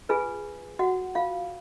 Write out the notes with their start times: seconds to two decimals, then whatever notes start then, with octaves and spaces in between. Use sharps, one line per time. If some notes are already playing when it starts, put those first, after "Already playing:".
0.09 F4 G#4 B4 G#5
0.79 F#4 F#5
1.15 F4 F5